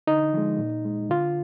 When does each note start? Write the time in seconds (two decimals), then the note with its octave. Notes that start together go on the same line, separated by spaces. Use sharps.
0.07 D3 D#4
0.34 F3 G#3
0.58 A#2
0.85 G#3
1.10 D3 F4